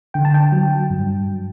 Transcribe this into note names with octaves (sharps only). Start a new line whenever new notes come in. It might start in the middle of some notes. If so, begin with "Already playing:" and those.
D3 G5
A5
G5
F#3
G2